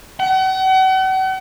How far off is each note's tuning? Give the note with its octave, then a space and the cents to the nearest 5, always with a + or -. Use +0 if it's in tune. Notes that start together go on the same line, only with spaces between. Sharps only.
F#5 +40